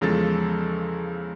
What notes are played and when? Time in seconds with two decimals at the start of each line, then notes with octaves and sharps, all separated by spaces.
0.01 E2 C#3 F3 G#3 A4 A6